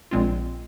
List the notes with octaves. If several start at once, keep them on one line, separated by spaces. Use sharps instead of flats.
A#1 A#2 G#3 C4 F4